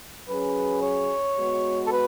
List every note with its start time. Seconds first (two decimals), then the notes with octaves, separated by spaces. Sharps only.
0.28 F#3 C#4 G#4 B4
0.82 C#5
1.36 G#3 B3 F#4
1.86 A4
1.91 B4